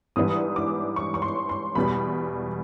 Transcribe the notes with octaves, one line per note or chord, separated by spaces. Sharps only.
G#2 E3 G3 B3 D4 D#6
D6
C#6
C#6
C6
C6
E2 B2 G3 B5